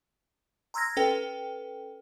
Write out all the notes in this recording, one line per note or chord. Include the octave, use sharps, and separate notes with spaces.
A#5 C6 E6 F6 G#6 A#6
C#4 A4 B4 G5